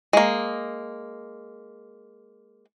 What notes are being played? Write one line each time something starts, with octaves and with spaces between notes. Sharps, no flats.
G#3 A#3